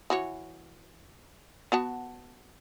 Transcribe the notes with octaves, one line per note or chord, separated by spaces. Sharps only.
E3 F#4 C#5
B3 F#4 A5